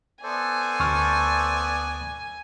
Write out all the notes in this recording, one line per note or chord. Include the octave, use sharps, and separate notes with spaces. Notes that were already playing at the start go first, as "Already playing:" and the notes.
B3 A4 C5 D5 E5 G#5
D2 C#6 F6